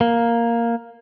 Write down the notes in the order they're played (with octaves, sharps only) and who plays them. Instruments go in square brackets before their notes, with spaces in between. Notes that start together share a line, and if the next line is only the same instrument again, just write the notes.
[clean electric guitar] A#3